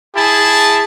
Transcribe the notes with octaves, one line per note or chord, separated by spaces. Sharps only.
E4 G#4 A5